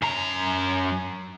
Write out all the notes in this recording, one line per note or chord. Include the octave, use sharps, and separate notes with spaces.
F#2 A#5